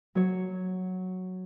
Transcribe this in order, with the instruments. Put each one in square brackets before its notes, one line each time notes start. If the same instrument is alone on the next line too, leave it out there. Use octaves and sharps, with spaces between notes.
[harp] F#3 C#5